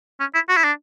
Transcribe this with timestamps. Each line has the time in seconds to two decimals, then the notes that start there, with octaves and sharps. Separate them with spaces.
0.20 C#4
0.34 E4
0.49 F#4
0.56 E4
0.64 D4